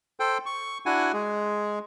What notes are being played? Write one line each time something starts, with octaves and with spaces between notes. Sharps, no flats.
A4 C5 G5
C#6
D4 E4 F#4 F#5 G#5
G#3 G#4